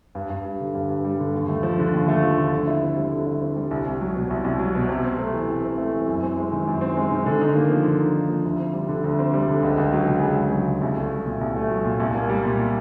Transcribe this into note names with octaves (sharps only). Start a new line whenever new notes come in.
G2
G2
G3
D3
G2
G2
G3
D3
D#2
A3
F3
D3
D#2
A3
F3
D3
D3
E4
C4
G3
D3
E4
C4
G3
C2
C2
F#3
B2
C2
C2
F#3
B2
C3
C4
A3
E3
C3
C4
A3
E3
F#2
C4
G#3
D#3
F#2
C4
G#3
D#3
D3
D#4
A#3
F3
D3
D#4
A#3
F3
D2
C4
G3
D3
D2
C4
G3
D3
C#2
C#2
F#3
C#3
C#2
C#2
F#3
C#3
C2
A3
F#3
A#2
C2
A3
F#3
A#2
C2
A#3
G3
A#2